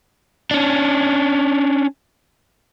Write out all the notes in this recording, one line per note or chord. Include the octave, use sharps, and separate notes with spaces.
C#4 D4